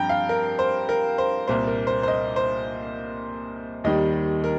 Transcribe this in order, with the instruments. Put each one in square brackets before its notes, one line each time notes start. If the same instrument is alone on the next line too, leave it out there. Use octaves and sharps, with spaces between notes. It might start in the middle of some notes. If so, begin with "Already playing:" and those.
Already playing: [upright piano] G2 F3 C4 G5 A#5
F5
A#4
C5
A#4
C5
C2 A#2 A#3 C5
A#4
C5
C5
D#5
C5
D#2 D#3 G3 D#5
A#4